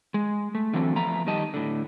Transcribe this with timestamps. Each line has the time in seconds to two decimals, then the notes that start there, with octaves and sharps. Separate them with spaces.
0.14 G#3
0.55 A3
0.74 D3 E3 F#3 C4 G4 A4
0.96 F3 A3 B3 A#5
1.27 D#3 G3 D#5 A5
1.54 A2 D3